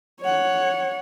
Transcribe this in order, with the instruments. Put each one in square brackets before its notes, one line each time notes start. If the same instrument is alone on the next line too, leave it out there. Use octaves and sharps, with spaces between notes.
[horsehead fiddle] C#5 F#5